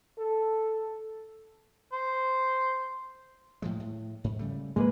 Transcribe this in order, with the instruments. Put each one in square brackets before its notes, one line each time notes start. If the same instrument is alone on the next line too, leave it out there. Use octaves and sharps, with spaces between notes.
[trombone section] A4
[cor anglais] C5
[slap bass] A2 F3 G#3
A2
G#2
C#3 G3 A3
[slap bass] G#2 [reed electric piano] G#3 A#3 B4